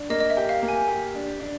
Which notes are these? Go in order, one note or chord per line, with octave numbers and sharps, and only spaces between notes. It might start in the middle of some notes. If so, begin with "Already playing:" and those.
Already playing: D4
A#3 D#5
D#5
E5
G4
F5
A#3
G#5
G4
D4
D4